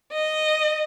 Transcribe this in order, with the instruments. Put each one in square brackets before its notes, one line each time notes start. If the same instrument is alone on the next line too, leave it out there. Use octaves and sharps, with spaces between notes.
[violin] D#5